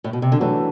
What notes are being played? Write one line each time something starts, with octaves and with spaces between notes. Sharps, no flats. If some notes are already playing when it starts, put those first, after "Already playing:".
A2
B2
C3
D3
E3 F#3 A3 D4